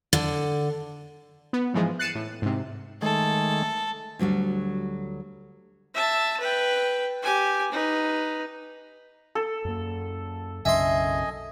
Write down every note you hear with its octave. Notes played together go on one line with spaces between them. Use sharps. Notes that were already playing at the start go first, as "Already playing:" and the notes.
D3
B3
G#2 E3 F3 G#3
F#6 A6 C7 C#7 D#7 E7
A2
G#2 C3
D#3 G#3 A3 A4
D2 F#3 G3 F#4
E5 A5
B4 G5
G4 G#5
D#4 B4
A4
F#2 A#3
B1 F#2 C#3 D#5 E5 G#5 C6